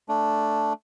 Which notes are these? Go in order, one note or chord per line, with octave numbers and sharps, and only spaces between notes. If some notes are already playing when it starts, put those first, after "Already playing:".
A3 D4